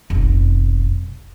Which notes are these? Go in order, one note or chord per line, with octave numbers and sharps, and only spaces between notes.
F1 B1